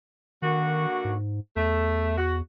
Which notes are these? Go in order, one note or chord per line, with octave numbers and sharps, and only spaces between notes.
D3 D#3 A#3 F#4
G#2
E2 A3
F#4